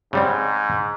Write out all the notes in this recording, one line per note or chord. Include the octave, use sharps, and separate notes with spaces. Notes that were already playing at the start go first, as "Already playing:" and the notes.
G#2 C#3 G3 C4